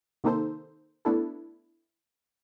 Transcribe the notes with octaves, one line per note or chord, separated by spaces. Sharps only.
C3 D#3 A#3 D#4 A4 C5
A3 B3 D4 E4 A4